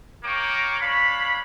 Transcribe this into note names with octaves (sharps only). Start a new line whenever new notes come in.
A#3 A#4 C#5 G5 C#6 D6
D4 C#5 F5 B5